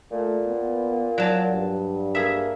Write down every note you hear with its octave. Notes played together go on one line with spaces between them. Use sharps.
A#2 A3
B3
F#3 D5 A5
G2
A#3 G#4 E5